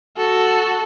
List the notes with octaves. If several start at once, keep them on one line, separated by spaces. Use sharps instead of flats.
F#4 A4